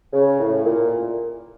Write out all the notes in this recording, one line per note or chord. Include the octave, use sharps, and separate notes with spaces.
C#3
A2
A#2